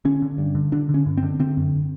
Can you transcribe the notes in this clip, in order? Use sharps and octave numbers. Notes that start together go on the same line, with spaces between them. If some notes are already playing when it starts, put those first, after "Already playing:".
D3 C#4
D3
G2
D3
D3 D4
D3
C#4
G2
C4
D3
D3 C4
F#2